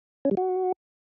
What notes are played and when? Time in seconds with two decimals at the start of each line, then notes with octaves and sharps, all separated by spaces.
0.25 C#4
0.31 G3
0.37 F#4